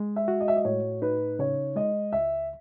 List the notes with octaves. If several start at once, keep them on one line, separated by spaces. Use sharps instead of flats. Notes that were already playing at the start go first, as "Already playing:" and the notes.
Already playing: G#3
E5
F#4
D#5
E5
D#5
A2 C#5
D#4 B4
C#3 C#5
G#3 D#5
C#2 E5